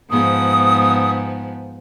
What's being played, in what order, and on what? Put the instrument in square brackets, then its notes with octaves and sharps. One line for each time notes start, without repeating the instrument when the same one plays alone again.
[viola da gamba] G#2 F3 B3 [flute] D#6